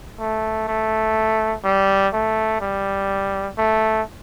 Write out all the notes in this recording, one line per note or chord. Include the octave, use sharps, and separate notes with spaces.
A3
A3
G3
A3
G3
A3